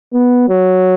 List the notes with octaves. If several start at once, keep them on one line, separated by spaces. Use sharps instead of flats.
B3
F#3